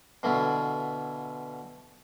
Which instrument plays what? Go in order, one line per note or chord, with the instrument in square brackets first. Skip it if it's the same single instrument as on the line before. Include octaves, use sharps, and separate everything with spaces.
[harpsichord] B2 D3 E3 E4 F4